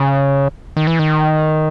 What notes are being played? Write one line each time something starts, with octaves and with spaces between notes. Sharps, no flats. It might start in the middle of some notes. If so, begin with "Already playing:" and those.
Already playing: C#3
D#3
E3
D#3